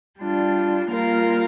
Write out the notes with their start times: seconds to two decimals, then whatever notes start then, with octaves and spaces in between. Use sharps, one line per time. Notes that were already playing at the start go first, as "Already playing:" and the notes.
0.19 G3 D4 F4
0.90 G3 A#3 F4 A#4 F5